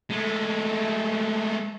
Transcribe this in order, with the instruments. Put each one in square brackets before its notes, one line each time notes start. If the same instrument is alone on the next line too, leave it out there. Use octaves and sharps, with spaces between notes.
[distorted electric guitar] G#3 A3